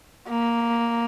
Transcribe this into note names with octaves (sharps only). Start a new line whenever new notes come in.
A#3